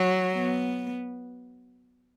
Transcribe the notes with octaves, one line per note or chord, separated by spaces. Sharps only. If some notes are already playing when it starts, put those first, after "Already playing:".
Already playing: F#3
B3